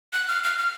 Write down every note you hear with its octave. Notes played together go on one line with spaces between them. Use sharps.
F#6
F6
F6
F6